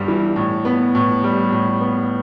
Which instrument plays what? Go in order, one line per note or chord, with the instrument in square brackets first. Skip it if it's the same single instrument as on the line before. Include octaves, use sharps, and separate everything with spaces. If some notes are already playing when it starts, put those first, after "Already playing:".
Already playing: [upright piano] G1 G2 G3
E3
A2
B3
A2
G3
A2
B3